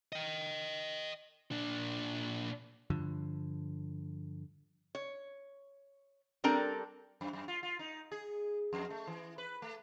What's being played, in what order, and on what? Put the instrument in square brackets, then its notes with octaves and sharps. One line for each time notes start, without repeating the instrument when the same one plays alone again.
[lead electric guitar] D#5 G5
A#2 D4
[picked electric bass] G2 D3 F3
[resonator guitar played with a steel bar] C#5
G3 C4 D4 A4 A#4 A#5
[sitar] F#2
F#2
F4
F4
D#4
G#4
F2
A3
E3
B4
A3